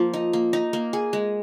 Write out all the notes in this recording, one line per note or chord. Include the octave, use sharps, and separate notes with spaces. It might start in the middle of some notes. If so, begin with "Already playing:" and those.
Already playing: F3 A#3
D#4
A#3
D#4
A#3
G#4
G#3